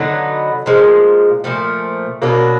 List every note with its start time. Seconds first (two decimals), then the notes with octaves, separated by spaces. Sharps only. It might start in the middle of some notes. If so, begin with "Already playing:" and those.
Already playing: D3 F#3 B3 D#4
0.66 A#2 F3 G#3
1.44 A#2 F3 A3
2.22 B2 F#3 A#3 D4